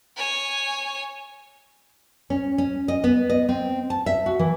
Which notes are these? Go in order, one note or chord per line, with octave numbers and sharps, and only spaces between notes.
C#5 G#5
C#4
C#4
D#5
B3
D#5
C4
A5
E5
F#4
E3